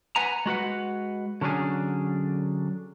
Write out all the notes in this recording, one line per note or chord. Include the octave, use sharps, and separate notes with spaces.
B4 F#5 G#5 A#5
G#3 F#4 B4 F#5
D3 F#3 C#4 D4 G#4